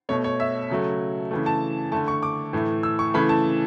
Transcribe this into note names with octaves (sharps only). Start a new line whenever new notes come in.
B2 A3 C#5
C#5
E5
C#3 F#3 A3
C#3 E3 A3
A5
D3 A3 A5
C#6
D6
A2 E3 A3
E6
C#6
C#3 E3 A3 B5
A5